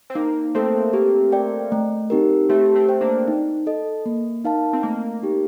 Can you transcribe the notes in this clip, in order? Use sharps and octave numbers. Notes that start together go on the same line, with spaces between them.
C4
A#3 D#4
A3 C4 A4 C5
A#3 G4
D5 G5
A3
C4 D#4 G4 A#4
A3 C4 G4
A3 C4
C5 G5
A#3 D4
D#4
A4 D#5
A#3
D#4 A#4 F5 A5
C4
A3 A#3
D#4 G4